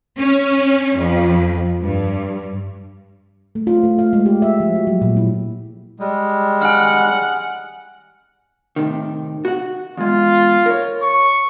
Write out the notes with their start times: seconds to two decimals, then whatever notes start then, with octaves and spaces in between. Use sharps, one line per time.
0.19 C#4
0.96 F2
1.83 G2
3.55 A3
3.67 F4
3.84 A3
3.99 F5
4.13 G#3
4.26 G4
4.42 E5
4.60 F3
4.75 F#4
4.87 F#3
5.01 A#2
5.17 E4
5.99 G3 G#3
6.62 F#5 G#5 F6
8.76 A2 C3 D#3
9.45 F#4 F#5
9.97 E2 G#3 F4
10.66 A#4 C#5
11.02 C#6